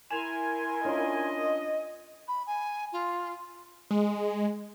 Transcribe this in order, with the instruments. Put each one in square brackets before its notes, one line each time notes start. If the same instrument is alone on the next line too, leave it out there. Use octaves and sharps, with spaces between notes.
[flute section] E4 A#4 C6 [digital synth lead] G#5 [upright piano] E7 F7
[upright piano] C#4 D4 F4 [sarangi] D#5
[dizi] B5
G#5
F4
[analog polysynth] G#3